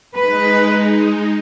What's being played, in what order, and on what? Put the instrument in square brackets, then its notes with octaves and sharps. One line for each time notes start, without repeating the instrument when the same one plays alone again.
[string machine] G#3 D#4 [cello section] B4